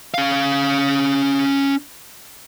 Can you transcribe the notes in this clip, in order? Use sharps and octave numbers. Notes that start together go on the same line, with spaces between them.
C#4 F5